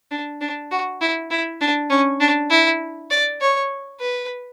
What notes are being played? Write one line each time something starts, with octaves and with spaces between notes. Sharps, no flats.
D4
D4
F#4
E4
E4
D4
C#4
D4
E4
D5
C#5
B4